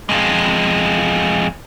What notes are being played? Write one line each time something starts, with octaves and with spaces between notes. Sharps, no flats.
F2 G#3